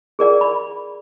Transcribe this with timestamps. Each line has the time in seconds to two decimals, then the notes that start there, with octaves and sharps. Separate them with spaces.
0.19 G#4 A#4 D5 F#5
0.41 B5